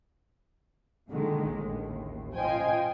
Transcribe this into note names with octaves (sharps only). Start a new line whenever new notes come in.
A#2 D3 D#3 G#3
A1 D#2
F4 C5 D#5 G5 G#5